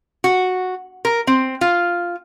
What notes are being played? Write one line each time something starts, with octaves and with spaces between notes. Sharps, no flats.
F#4
A#4
C4
F4